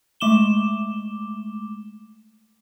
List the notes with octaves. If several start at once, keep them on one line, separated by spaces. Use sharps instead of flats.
G#3 A3 D6 E7 G7